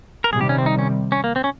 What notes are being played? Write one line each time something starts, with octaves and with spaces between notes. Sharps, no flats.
A#4
C3 D#3 G3 G#4
G4
C#4
C4
D#4
C#4
C#4
A#3
C4
C#4